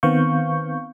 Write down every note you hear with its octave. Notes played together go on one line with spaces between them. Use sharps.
D#3 B3 C4 F5 C#6 G6